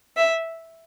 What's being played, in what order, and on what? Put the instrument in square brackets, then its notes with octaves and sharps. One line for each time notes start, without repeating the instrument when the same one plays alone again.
[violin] E5